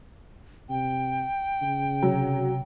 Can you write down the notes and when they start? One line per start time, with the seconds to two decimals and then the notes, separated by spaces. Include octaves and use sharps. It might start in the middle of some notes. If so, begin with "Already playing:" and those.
0.70 C3 G5
1.62 C#3
2.03 C3 F#3